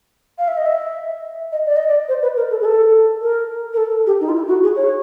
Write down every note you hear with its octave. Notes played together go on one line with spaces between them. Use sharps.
F5
E5
D#5
E5
D#5
D5
D#5
D5
C5
B4
A#4
A4
G#4
A4
A#4
A#4
A4
G4
D#4
F4
E4
F#4
G#4
C#5